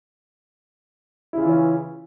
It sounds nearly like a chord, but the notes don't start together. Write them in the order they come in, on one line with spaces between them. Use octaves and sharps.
E4 C#3 F4 E3 C#4